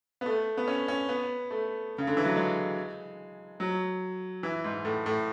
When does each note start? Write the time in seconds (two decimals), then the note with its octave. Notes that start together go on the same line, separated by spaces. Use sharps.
0.21 B3
0.26 A3
0.57 B3
0.68 C#4
0.88 C#4
1.09 B3
1.51 A3
1.98 C#3
2.07 D3
2.17 E3
2.25 F#3
2.35 G#3
3.60 F#3
4.43 E3
4.64 G#2
4.85 A2
5.06 A2